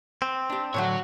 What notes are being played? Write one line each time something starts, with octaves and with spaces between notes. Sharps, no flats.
C4
D4 G4
A2 D3 F#3 F#4 C#5